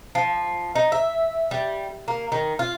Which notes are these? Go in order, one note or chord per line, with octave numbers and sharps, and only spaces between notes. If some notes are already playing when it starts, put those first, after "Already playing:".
F3
D#4
E5
G3
A#3
D#3
F4